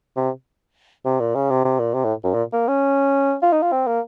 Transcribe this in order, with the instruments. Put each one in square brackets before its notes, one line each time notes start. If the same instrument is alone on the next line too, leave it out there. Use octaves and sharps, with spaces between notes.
[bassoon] C3
C3
A#2
C#3
C3
C3
A#2
C3
A2
F#2
A#2
A#3
C#4
F4
D#4
F4
C4
A#3